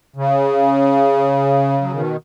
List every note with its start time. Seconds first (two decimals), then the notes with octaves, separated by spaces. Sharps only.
0.16 C#3
1.81 F#3
1.93 B2 D#3